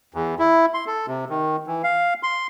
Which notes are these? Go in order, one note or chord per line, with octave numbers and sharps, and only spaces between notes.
E2
E4
C6
A4
C3
D#3
E3
F5
C6